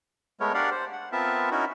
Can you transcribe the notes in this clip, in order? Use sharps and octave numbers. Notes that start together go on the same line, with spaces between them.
G#3 A3 B3 A#4 C#5
D4 G4 A#4 D5 F5 F#5
C5
F#5
B3 C4 F4 A#4 E5 A5
C#4 D#4 E4 F#4 A#4